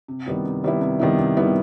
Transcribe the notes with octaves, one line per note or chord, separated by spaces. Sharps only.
C3
D#3 G3 B3 E4
C3
D#3 G3 B3 E4
C3
D#3 G3 B3 E4
C3
D#3 G3 B3 E4